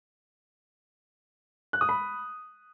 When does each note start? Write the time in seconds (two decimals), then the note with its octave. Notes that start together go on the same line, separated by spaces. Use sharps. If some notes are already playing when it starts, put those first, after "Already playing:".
1.73 F#6
1.81 D#6
1.89 B5